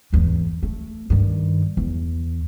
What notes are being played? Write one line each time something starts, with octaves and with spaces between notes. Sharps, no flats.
G#1 E2
A3
G2 D#3
E2